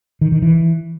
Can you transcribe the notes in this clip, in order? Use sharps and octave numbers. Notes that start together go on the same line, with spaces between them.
D#3
D#3
E3